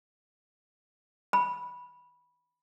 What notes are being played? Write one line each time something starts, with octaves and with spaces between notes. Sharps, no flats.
B5